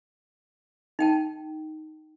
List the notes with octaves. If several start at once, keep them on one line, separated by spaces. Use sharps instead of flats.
D#4 G5 A5